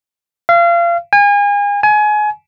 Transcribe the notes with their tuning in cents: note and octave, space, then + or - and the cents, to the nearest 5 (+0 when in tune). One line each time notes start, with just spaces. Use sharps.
F5 -30
G#5 -35
G#5 +25